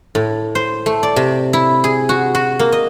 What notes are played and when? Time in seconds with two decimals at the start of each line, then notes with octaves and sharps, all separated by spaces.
0.15 A2
0.55 C5
0.86 A3
1.03 D5
1.16 C3
1.53 E4
1.84 G#4
2.09 F#4
2.35 F#4
2.59 A#3
2.72 D#5